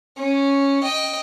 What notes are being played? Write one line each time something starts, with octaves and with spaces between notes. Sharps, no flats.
C#4
D#5 G5